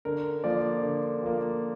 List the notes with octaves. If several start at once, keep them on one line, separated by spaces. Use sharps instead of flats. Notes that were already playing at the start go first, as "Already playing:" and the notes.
D3 A#4
F3 A#3 D5
D3
F3 A#3